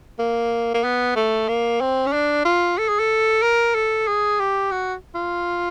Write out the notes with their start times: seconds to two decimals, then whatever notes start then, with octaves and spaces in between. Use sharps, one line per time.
0.19 A#3
0.74 A#3
0.84 B3
1.16 A3
1.48 A#3
1.81 C4
2.06 C#4
2.13 D4
2.45 F4
2.78 A4
2.88 G#4
2.99 A4
3.43 A#4
3.75 A4
4.07 G#4
4.39 G4
4.71 F#4
5.15 F4